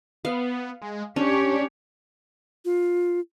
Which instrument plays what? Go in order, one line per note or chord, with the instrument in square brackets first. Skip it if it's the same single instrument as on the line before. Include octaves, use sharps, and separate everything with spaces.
[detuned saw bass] B3 [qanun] F5
[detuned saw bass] G#3
[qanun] C#4 [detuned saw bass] D4 [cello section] G4 C#5
[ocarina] F4